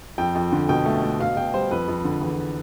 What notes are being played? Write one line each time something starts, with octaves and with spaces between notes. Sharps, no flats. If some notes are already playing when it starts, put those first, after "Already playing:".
F2 G5
F2
D3
B2 G5
A3
A3
B2 F5
B2 G5
G3 C5
F2 B4
F2
D3
E2